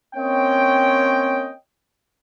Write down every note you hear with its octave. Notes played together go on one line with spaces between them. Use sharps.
A#3 C4 C#4 C#5 D#5 G5